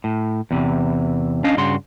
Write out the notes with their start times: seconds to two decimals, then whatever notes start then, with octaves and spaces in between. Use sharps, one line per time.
0.04 A2
0.51 E2 C3 E3
1.44 C#4 D4 D#5 F5
1.57 G2 C#3 F#4 C6